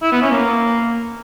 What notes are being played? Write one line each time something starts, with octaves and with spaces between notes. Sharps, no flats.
E4
B3
C#4
A#3